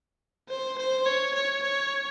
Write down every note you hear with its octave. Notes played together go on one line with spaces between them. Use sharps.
C5
C5
C#5
C#5
C#5